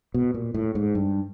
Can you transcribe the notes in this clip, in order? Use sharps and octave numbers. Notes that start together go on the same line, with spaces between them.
B2
A#2
A2
G#2
G2